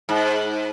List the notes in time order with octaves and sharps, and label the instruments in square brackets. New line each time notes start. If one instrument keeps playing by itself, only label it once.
[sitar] G#2